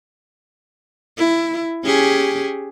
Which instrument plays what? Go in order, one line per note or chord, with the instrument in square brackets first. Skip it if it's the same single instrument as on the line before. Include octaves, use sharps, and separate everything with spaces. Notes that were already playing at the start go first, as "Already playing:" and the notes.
[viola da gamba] E4
C#4 G4 G#4